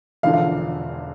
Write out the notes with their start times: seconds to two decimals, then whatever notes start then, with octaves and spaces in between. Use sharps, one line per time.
0.23 E1 E2 D3 F3 F5
0.33 F5